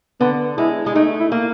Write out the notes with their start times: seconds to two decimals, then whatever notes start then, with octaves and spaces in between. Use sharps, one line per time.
0.21 D3 B3
0.58 G#3 E4
0.86 G#3
0.95 A3 D#4
1.20 E4
1.32 A#3